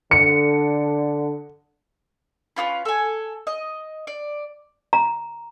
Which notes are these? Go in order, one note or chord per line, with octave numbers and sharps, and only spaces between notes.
D3 C#7
C#4 D4 F4 B4
A4 G#5
D#5
D5
A#5